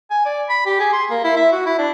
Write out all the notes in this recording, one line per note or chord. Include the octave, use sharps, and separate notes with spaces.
G#5
D5
B5
G4
G#4
C6
A#3
E4
E5
F#4
E4
D4